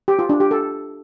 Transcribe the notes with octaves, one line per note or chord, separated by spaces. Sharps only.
G4
F4
D4
G4
A4